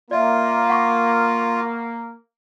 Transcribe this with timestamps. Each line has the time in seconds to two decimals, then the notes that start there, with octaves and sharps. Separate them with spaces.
0.11 A#3 F4 D5 E5
0.70 F#5 C#6 D6